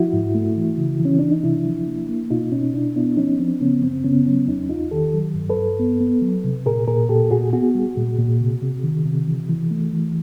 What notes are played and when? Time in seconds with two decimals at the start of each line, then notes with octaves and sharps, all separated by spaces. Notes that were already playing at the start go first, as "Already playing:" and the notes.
Already playing: F3 E4 F#4
0.13 G#2
0.35 A3
0.57 E3
0.78 C#3
0.99 E3
1.05 C#4
1.19 E3 D4
1.31 D#4
1.43 C3 D4 E4
1.65 F3
1.87 A#3
2.09 A#3
2.31 B2 D#4 F4
2.52 B2 C#4 D#4
2.74 B2 D4 E4
2.96 B3 D4 E4
3.17 F3 C#4 D#4
3.39 F3 C4 D4
3.61 C#3 B3 C#4
3.83 F#2 C4
4.04 C#3 B3 C#4
4.26 F#3 B3 C#4
4.48 E2 C#4 D#4
4.69 E2 D#4 F4
4.91 D#3 G4 A4
5.14 F#3
5.35 G2
5.50 A4 B4
5.57 G2
5.79 B3
6.01 B3
6.22 F#3
6.44 C3
6.66 A#2 G#4 A#4
6.87 A#2 G#4 A#4
7.09 A#2 G4 A4
7.31 A#2 F#4 G#4
7.53 B3 F#4 G#4
7.75 G3
7.97 A#2
8.18 A#2
8.41 C3
8.62 C3
8.84 D#3
9.06 C3
9.27 E3
9.49 E3
9.71 A3
9.93 E3